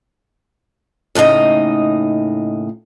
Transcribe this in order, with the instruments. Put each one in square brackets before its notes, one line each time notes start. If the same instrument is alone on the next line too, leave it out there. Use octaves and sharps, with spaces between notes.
[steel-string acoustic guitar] D#2 A2 C#3 D#4 D#5